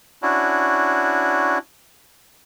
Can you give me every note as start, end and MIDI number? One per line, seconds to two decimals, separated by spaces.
0.23 1.58 61
0.23 1.58 62
0.23 1.58 64
0.23 1.58 66